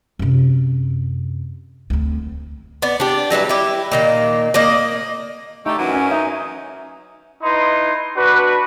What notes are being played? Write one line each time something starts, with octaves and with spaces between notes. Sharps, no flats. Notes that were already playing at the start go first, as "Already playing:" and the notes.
F#2 C3
D2 C4
B3 D5
D4 G4
F#3 G3 E4 B4
E4 G4
A#2 D#3 A#3
A#3 D5 D#5
D3 A3 D#4 G4
F#2 E3 F#3 F#4
C#4
D#4 E5
D#4 E4 B4 C6
D4 F#4 B4